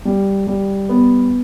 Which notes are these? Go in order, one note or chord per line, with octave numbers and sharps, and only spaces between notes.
G3
G3
B3